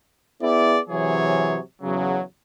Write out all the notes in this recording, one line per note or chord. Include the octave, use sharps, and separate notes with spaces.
B3 E4 G#4 D5
C3 E3 F#3 G#4 C#5
E2 C#3 F#3